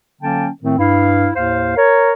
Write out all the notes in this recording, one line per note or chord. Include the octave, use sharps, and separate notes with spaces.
D3 F#3 A#3 C#4 G5 A5
A2 D#3 A3 C4
G2 E4 F5
D#2 A2 C5 F5
A#4 C#5